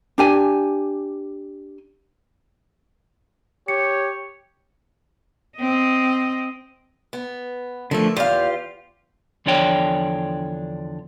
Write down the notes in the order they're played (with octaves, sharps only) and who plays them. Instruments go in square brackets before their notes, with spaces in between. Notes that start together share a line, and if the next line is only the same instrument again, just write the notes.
[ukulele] D4 G4 G#5
[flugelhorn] G4 [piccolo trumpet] C#5 [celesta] C#7
[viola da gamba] C4 D#5
[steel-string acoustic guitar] B3
[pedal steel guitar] D3 F3 A3 [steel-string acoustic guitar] A#3 A4
[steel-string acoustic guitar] E2 F5 [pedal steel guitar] F4 G4
[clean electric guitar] E2 D3 F3 D4 C#5 G5